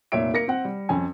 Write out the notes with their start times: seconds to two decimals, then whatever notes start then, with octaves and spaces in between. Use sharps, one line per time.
0.12 F1 A#2 C#5 E5 D7
0.34 A#3 A#6 C#7
0.48 C4 F#5
0.65 G3
0.89 F2 C#4 G#5